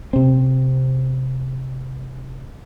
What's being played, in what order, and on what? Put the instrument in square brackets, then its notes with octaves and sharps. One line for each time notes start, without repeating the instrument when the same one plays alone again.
[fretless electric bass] C3 C4